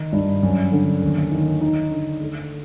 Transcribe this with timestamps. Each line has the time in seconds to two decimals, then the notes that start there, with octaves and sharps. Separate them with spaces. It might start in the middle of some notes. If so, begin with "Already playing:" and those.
Already playing: D#3 D#4
0.13 G2
0.43 F#2
0.72 D3
1.02 D#2
1.32 D#3
1.61 D#4
1.91 D3
2.21 A3